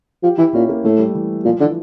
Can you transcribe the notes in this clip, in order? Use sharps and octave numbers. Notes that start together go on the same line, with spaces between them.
F3 G4
E3 E4
A#2 C#4
A#3
A2 A3
G3
E3
A#2 F3
D3 E3